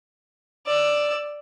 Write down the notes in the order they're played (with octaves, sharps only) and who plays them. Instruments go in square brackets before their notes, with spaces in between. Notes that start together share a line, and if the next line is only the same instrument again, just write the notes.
[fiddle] D5 E6